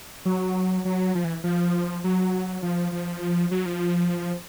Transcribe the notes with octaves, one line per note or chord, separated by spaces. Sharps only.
F#3
F#3
F3
E3
F3
F#3
F3
F3
F#3
F3